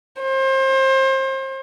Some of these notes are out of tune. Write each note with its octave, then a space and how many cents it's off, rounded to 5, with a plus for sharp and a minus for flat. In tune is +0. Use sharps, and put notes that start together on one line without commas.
C5 +30